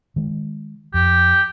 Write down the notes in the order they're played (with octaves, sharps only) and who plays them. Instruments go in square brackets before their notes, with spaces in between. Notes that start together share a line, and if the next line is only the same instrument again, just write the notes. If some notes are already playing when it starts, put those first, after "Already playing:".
[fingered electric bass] D#3 G#3
[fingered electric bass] F2 [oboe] G4